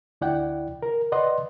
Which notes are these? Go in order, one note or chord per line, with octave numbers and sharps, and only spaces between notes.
D2 E4 D5 F#5 G5
A#4
B4 D5 D#5 F#5 C6